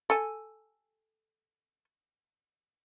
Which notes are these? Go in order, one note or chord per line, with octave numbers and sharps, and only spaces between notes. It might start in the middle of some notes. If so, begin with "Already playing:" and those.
A4 G#5